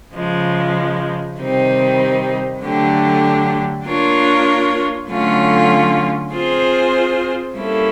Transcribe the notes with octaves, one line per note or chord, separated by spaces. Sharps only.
C#3 F3 G#3
C3 D#3 G3 C4 D#4
D3 F#3 A3 D4 G4
A#3 D4 F4 A#4 C#5
D3 F#3 A3 C#4 F4
C4 F4 G#4 C5
G3 A#3 C#4 E4 A4